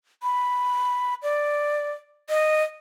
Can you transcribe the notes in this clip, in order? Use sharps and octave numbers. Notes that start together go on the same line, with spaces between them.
B5
D5
D#5